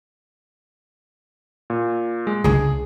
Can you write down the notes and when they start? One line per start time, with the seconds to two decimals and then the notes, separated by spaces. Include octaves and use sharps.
1.70 A#2
2.27 G#3
2.44 C#2 D4 G#4